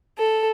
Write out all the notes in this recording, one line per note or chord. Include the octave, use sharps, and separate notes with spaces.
A4